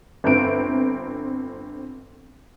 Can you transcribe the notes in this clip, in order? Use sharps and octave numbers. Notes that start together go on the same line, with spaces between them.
G1 C4 D7